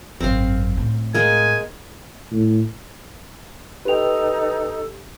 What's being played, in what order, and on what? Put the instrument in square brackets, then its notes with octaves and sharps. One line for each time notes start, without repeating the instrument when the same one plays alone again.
[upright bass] G#1 F#2 [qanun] C4 F5
[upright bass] A2
[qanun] G#3 A#3 [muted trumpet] G#5
[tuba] A2
[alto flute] D#4 [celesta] G4 F7 [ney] A4 [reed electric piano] B4 G5